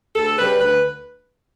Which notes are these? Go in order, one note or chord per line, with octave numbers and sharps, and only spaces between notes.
D2 A4
C#3 G3 B4
D2 B4